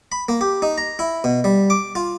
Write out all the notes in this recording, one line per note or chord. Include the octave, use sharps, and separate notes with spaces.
B5
A#3
G4
D#4
A#5
E4
B2
G3
D6
F4